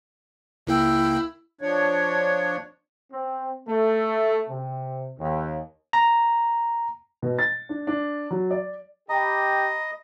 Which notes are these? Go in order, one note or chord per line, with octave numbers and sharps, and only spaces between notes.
C#2 A#3 E4 G5
F3 D4 C#5
C4
A3
C3
D#2
A#5
B2
A6
D4
D4
F#3
D5
G4 D#5 A#5 B5